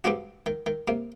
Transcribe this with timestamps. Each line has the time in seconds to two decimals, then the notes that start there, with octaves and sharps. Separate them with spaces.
0.04 G2 G3 G#3 C4 D4 F#4
0.46 D#3
0.66 D#3
0.88 C3 A#3